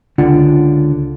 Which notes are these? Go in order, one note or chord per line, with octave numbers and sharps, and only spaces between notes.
C#2 D3 D4 F4 F#5